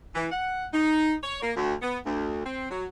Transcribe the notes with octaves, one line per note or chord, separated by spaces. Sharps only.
E3
F#5
D#4
C#5
A#3
D2
B3
D2
C4
F#3